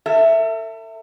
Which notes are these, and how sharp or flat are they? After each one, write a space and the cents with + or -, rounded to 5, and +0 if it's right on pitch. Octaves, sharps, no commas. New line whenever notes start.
A4 +40 E5 +0